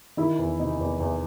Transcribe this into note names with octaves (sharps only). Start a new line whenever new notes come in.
D#3 E4
E2
C3 D#4
E2
E2